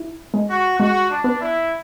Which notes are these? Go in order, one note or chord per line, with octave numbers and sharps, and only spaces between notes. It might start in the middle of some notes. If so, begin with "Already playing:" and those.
Already playing: E4
G#3
F#4
G#3 F#4
D4
B3
E4